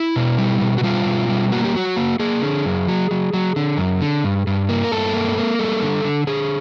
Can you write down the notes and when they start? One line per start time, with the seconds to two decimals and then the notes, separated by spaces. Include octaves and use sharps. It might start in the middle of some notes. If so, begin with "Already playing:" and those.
Already playing: E4
0.16 B2
0.38 G3
0.61 B2
0.78 F#4
0.83 G3 F4
1.06 B2
1.29 G3
1.52 A#3 F#4
1.65 G4
1.75 F#3 F#4
1.96 A#3
2.19 A#3 G#4
2.42 D3
2.65 F#2
2.88 F#3
3.11 F#3
3.34 F#3
3.56 D3
3.78 F#2
4.01 D3
4.24 G2
4.47 G2
4.69 A#3
4.84 A#4
4.92 G2 A4
5.14 A#3
5.38 A#3
5.59 G3 A4
5.82 D3
6.04 D3
6.27 D3 G#4